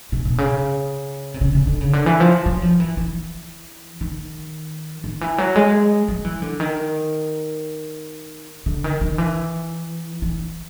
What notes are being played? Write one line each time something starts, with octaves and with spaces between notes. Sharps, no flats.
B2
B2
C#3
C3
C#3
C#3
D3
C#3
D3
E3
F3
F#3
F3
E3
E3
D#3
D#3
E3
F#3
G#3
F#3
E3
D3
D#3
D3
D#3
D#3
E3
E3